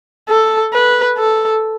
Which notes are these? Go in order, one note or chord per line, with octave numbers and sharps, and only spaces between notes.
A4
B4
A4